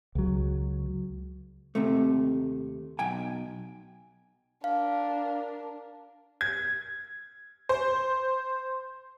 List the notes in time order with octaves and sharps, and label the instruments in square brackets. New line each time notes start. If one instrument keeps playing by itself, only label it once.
[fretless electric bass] C#2 F#3
[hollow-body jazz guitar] D#2 C3 A3
B1 G5 G#5
[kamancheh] D4 A#4 [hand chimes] F5
[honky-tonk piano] G#6
C5